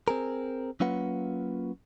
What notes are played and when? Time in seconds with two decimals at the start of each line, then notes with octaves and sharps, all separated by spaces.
0.08 C4 G#4 A#4
0.80 F#3 A#3 C#4 F4 B4 F#5